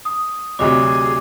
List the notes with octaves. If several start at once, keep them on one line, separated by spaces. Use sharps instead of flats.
D#6
D2 C3 F#3 G#4 D#5 D6